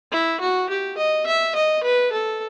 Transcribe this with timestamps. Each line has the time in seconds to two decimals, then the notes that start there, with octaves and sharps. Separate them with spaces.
0.12 E4
0.40 F#4
0.70 G4
0.98 D#5
1.27 E5
1.55 D#5
1.84 B4
2.12 A4